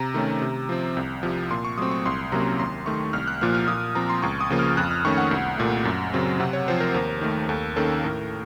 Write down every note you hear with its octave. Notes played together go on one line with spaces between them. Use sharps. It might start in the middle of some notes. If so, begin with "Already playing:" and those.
Already playing: C3 A#5
D#3 A3 C#4
C3
F3 C4
C2
C3 F3
A#2 C6
C#6
F#3 A3 C4 D#6
C#6
C2 C6
C3 F#3 A#3 C#4 A#5
D#2 C6
D#3 A3 C#6
C2 F6
F#6
A#2 F3 A#3 F6
F6
A#2 D#6
F3 C4 A#5
C6
C#2 C#6
D#6
C#3 F3 A#3
F6
F2 F#6
F6
D#3 A3 C#4 C#6
F#5
C2
A#2 A3
F#2
C#3 F#3 C4
C3 F#5
C#5
F3 C4 C5
A#4
D#2 A#4
D#3 A3
D#2 A4
D#3 A#3 C#4 A4
A2 A#4